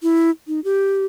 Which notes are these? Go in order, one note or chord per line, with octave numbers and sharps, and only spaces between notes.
E4
D#4
G4